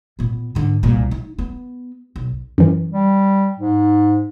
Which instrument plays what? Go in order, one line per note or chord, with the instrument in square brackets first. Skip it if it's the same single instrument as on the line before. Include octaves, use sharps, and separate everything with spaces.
[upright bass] A#2 B3
G#2 D3
C2 A#2
D#4
B3
B1
[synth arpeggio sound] F#2 E3
[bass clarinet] G3
G#2